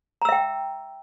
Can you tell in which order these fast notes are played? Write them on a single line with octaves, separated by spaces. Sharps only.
A#5 E6 E5 G5